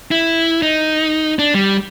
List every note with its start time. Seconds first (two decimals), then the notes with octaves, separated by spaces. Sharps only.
0.11 E4
0.62 D#4
1.39 D4
1.54 G3